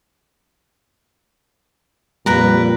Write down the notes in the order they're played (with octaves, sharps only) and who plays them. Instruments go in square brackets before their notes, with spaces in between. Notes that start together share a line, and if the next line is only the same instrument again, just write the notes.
[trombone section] F2 A#2 [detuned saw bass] G3 [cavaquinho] A#4 B4 A#5